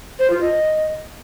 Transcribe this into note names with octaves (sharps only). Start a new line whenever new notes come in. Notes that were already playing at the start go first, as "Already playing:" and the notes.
C5
F4
D#5